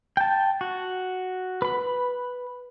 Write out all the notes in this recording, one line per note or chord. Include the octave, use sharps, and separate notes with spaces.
G5 A5
F#4
B4 B5